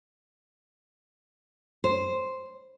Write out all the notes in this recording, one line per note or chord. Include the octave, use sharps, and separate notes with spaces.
C5